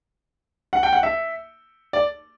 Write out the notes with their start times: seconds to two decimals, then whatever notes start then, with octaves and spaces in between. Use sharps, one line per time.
0.73 F#5
0.83 G5
0.93 F#5
1.03 E5
1.93 D5